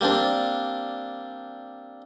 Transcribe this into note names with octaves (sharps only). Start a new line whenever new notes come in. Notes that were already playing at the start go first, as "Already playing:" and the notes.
G3 A#3 C4 D4